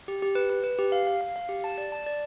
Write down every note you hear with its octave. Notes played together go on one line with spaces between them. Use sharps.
G4
G4
B4
B4
B4
G4
F5
F5
F5
F5
G4
A5
D5
A5
D5